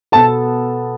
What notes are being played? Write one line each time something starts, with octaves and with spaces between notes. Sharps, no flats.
B2 B3 A4 A5